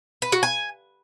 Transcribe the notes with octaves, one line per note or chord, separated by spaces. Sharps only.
B4
F#4
G#5